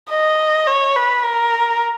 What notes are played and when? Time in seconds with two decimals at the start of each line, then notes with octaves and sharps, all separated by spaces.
0.10 D#5
0.67 C#5
0.96 B4
1.25 A#4